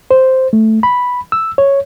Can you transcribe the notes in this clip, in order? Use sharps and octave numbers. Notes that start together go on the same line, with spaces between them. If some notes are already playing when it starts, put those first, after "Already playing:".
C5
A3
B5
E6
C#5